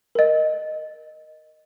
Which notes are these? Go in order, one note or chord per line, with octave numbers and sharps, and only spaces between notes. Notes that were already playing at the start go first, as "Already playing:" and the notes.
A#4 D#5